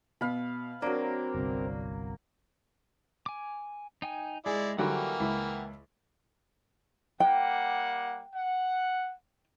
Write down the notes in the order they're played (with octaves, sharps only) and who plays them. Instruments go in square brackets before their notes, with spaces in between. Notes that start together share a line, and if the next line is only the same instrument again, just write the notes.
[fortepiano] B2 [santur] F5 B5
[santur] F#3 A#3 [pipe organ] C4 A#4 [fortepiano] D4
[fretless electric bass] G1 C2
[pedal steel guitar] G#5 D6
D#4 G5 G#5
[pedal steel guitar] G#3 [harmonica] E4 D5 [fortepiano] G#4
[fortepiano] D3 F#3 G3 [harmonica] E3 A#3 [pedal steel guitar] F#5 G5 C#6
[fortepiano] C#2 E4
[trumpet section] G3 A#3 F#5 [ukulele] G5
[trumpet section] F#5